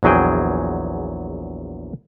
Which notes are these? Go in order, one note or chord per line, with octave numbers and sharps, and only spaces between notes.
A#1 E2 F#3 G#4 G5